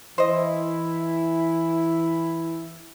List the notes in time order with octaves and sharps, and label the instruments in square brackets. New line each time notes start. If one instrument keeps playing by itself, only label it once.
[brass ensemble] E3 E4 [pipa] C5 D#5